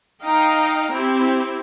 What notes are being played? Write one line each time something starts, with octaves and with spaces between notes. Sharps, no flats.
D#4 D#5 F5 G5 A#5
C4 E4 G4